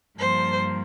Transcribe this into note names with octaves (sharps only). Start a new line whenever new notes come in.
G2 F3 A#3 C5